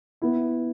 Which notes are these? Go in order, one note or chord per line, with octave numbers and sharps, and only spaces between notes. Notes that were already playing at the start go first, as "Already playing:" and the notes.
B3 E4